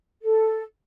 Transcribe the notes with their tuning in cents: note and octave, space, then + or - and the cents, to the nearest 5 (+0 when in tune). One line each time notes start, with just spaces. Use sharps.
A4 +0